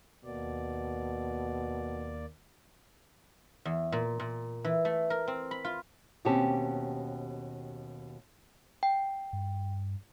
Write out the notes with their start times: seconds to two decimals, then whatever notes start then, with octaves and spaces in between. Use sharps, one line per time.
0.24 D#2 B2 A#3 D5
3.65 E2
3.92 A#2
4.20 A#2
4.64 E3
4.85 A3
5.10 A#4
5.28 C4
5.51 B5
5.64 F4
6.25 D#2 B2 C4 C#4 G4 A5
8.83 G5
9.33 G2